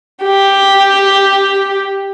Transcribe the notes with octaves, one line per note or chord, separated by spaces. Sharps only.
G4